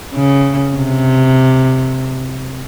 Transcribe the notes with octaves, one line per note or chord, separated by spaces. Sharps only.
C#3
C3